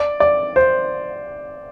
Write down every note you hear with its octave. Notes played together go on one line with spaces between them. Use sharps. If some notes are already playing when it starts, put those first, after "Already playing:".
Already playing: D5
D5
C5